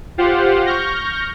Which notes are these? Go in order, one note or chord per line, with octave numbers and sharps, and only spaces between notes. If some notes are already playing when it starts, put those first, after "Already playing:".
F4 G4 C5 F5 F#5
C#6 F6 G6 A#6